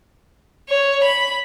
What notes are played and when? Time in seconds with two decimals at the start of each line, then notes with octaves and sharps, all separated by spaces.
0.69 C#5
1.03 B5